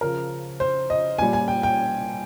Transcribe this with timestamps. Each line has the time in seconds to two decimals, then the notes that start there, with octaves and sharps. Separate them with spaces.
0.01 C#3 F3 A#4
0.60 C5
0.90 D#5
1.19 A#2 G3 G#5
1.33 G#5
1.48 G5
1.63 G5